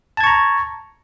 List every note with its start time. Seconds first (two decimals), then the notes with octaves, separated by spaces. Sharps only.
0.17 A5
0.21 G#6
0.24 C#6
0.27 A#5